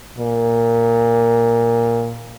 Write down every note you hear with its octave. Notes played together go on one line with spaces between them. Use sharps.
A#2